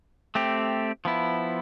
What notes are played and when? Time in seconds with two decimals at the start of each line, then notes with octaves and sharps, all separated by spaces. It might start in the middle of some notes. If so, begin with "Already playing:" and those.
0.35 A3 C4 G4
1.05 F3 B3 E4